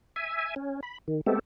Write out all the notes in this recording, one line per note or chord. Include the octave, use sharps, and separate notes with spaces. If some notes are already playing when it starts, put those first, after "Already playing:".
E5 G#5
C#4
B5
D#3
G#3 A3 B3 C4 G4 A4